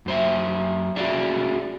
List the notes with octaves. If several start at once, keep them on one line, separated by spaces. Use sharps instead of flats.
F#2 C5 E5
C#4 F4 F#4 G#4 D5 E5